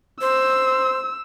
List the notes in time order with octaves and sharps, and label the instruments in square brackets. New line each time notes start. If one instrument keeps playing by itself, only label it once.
[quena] C5 [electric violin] E6